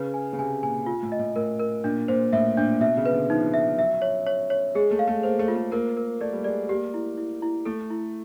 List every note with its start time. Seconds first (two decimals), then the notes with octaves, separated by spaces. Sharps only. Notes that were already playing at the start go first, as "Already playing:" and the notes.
Already playing: C#3 B4
0.14 G#5
0.33 C#3
0.38 C3 G#5
0.63 A#2 G#5
0.86 F4
1.03 A2
1.12 D#5
1.19 A2
1.36 A2 A#4
1.60 A#4
1.84 A#2 D4
2.08 A#2 C5
2.33 A2 E5
2.57 A#2 D4
2.81 B2 E5
2.97 C#3
3.06 B4
3.13 D3
3.29 F3 D#4
3.54 E5
3.77 F#3 E5
4.02 C#5
4.26 C#5
4.50 C#5
4.75 G#3 G#4
4.91 A3
4.99 F5
5.07 A3
5.23 A#3 C5
5.39 A3
5.48 F4
5.55 A3
5.71 A#3 A#4
5.97 A#4
6.21 A3 D5
6.32 G3
6.44 G#3 D5
6.69 A#3 G4
6.94 E4
7.18 E4
7.42 E4
7.66 A3 A4
7.90 E4